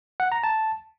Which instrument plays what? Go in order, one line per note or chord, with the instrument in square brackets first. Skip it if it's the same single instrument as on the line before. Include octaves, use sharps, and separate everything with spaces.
[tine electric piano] F#5
A#5
A5